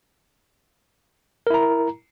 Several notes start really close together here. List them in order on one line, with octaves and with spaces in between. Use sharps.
A#4 E4 A#5